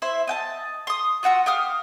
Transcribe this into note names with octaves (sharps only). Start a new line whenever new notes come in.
E4 C5 E5
D#5 G5 A5
C6 D#6
F4 F#4 F#5 E6
G4 F5 D#6 F6